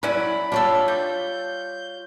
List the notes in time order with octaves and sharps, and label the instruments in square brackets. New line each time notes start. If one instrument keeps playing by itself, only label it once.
[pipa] F#3 C#4 E4 [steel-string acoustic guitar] D5 [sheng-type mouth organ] B5
[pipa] D4 G4 A4 [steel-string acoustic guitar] F4 C#5
[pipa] G3 [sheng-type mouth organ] G6